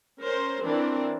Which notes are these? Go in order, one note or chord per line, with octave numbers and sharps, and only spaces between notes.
C#4 A#4 C5
E3 C4 D4 A#4